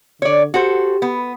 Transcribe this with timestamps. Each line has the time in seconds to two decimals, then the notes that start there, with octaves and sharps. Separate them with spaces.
0.22 D3 C#5 D5
0.54 F#4 G4 A4 C5
1.02 B3